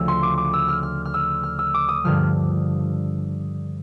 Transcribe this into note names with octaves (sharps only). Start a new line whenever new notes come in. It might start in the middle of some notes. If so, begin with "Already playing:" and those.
Already playing: D2 C#3 F3 E6
C6
D6
D6
E6
F6
F6
F6
E6
F6
E6
D6
D#6
G2 D3 F3 F6